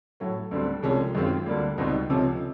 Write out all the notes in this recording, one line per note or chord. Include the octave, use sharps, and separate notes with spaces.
A2 F#3 A3
D2 D3 G3 C4
C2 C3 F3 G#3 C#4
F#2 D#3 G#3 C4 F4
D2 D3 G3 A#3
C#2 B2 G3 C4 D#4
C#2 C3 F3 A3 C#4